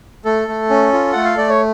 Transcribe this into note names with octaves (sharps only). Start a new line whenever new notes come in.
A3 A4
A3
C#4
F4
A3 F#5
F5
A3 D5
C#5